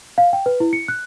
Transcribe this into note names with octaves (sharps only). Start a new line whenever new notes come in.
F5
G5
B4
E4
C#7
F#6